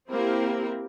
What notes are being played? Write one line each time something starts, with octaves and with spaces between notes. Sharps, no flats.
A#3 C4 E4 G4 A#4